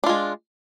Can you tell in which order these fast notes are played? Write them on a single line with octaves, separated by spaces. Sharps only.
D4 F4 G#3